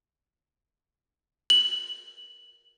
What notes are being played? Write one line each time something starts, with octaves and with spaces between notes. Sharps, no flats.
F#7